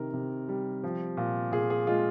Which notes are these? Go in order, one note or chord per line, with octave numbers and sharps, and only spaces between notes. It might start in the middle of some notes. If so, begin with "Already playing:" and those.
Already playing: C3 D#3 A#4
C3
G3
F3
A#2
A#2 G#4
G#4
G#3 F4